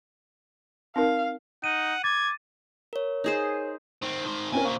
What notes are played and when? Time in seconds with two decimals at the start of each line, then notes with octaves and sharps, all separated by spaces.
0.96 C4 D#4 A#4 F5
1.64 D#4 F#5 D#7
2.04 D6 G#6 A6
2.93 A#4 C#5
3.24 D#4 G#4 C5
4.02 D#3 C4
4.25 D#3 C5
4.52 A#2 C4 C#4 A#4 G#5
4.65 A#2 D3 C5 F5 C#6